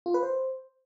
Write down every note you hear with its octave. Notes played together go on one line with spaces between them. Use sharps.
F4
B4
C5